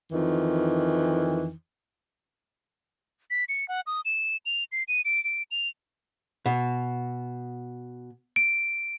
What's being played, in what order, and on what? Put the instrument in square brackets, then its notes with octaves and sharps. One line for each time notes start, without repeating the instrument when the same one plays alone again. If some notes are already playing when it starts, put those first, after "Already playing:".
[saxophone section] F2 D#3 E3
[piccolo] B6
C#7
F#5
D#6
E7
F7
C7
D#7
D7
D7
F7
[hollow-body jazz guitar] B2
[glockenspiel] D7